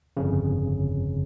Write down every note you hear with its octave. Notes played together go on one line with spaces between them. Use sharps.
G1 F2 C#3